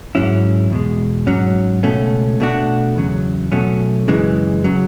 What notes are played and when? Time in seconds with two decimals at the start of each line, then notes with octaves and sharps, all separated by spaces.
0.15 G#2 F#3 C#4 E4
0.70 E2 B2 G#3
1.26 G#2 F#3 C#4 F#4
1.83 C#2 B2 A3 C#4
2.40 B2 A3 D4 F#4
2.96 E2 C#3 F#3
3.52 B2 F#3 A3 C#4
4.08 F#2 C#3 E3 G#3
4.64 C#3 F#3